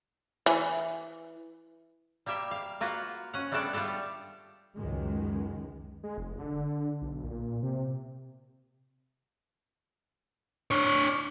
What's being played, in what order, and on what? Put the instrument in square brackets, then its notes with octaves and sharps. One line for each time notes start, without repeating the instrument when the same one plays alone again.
[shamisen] E3
[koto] G3 A#3 G4 E5 G5
F5
A#3 F4 F#4 B4
C#4 F#5
G3 A3 B3 D4 A4 D5
G3 F4 G4 A4 F5
[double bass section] C#2 F#2 D#3 G#3
[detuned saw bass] G#3
F1
D3
B1
A#2
C3
[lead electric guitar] D4 C#5